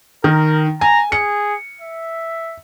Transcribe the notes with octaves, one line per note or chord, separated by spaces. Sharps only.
D#3 A#4
G#5 A#5
G#4 C#7
E5